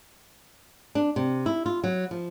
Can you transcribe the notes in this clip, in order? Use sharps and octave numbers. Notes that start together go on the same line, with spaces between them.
D4
C3
E4
F4
F#3
F3